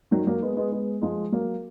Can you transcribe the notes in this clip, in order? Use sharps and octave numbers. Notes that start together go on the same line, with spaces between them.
D#3 F#3
F#3 A#3
G#3 B3
G#3 B3
G#3 B3
F3 G#3
F#3 A#3